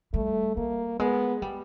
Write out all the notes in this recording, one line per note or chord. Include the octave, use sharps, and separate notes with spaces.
G3 A3
G3 A#3
G#3 B3
G3